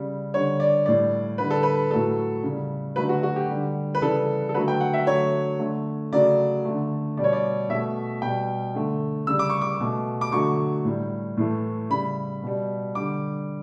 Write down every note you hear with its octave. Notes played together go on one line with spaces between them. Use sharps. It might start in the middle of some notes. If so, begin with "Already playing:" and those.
Already playing: C#3 G3
D3 G3 C#5
D5
A2 G3 D5
D3 G3 B4
A4
B4
A2 F#3 A3 A4
C#3
G3
D3 F#3 A3 B4
F#4
F#4
G4
D3 G3
B4
C#3 E3 G3 A4
A4
D3 F#3 A3 B4
G5
F#5
E5
D3 F#3 A3 C#5
D3 A3
C#3 F#3 A3 D5
D3 A3
B2 G3 D5
C#5
D5
B2 A3 E5
B2 G3 G5
D3 A3
C#3 G3 E6
D6
C#6
D6
B2 A3
D6
D3 F#3 A3 C#6
A2 G3
A2 E3 A3
C#3 G3 B5
B2 G3
D3 G3 D6